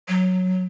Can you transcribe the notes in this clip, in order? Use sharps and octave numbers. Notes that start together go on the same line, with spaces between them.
F#3